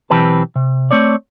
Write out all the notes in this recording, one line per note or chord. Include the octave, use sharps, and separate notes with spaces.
B1 E3 C4 G4 B4 A5
C3
A3 C4 C#5 D5